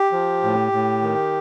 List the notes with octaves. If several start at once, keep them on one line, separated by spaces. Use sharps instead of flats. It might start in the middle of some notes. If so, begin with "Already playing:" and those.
Already playing: G4
F3
A2
A2
D#3